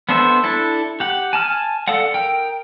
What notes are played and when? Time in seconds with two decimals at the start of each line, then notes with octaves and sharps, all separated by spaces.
0.09 B3 D4 A4 C5 E5
0.44 D4 E4 A4
1.00 G4 F#5
1.33 G#5 A5 F6
1.88 A4 D5 F5 F#5
2.14 A#4 G5